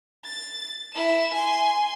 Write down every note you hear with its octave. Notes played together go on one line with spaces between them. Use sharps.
A6
E4 E7
G#5 C6